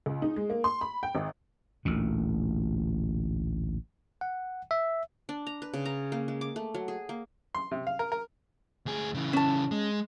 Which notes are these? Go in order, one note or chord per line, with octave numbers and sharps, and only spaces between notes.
C#2
D#4
G#3
A#3
C6
B5
G5
G#1
A1 D2 A#2
F#5
E5
D4
A#5
B4
C#3
A#5
A#3
G#3
D6
A3
F#3
G#4
A#3
C6
C3
F5
A#4
A#4
D2 G#4
C#3 E3
C#4 A5
G#3